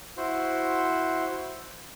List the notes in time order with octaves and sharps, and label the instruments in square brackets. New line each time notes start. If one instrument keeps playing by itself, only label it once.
[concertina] E4 F#4 C5